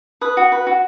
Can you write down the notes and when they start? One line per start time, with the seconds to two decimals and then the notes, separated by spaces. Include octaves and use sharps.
0.21 B4 D#6
0.37 F#4
0.52 B4
0.67 F#4